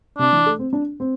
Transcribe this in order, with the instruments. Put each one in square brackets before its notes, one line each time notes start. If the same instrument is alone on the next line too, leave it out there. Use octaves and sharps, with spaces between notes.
[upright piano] C3 [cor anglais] D4
[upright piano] E3
A3
C4
D4
C4